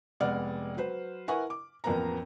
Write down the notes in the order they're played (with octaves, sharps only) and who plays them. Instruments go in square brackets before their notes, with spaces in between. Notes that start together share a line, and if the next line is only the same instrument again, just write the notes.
[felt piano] F1 G#3 B3 D5 F#5 F6
F#3 B4 C5
E4 A#4 B4 F#5 G#5 C#6
D6
A1 F2 A#3 B3 A#4 A#5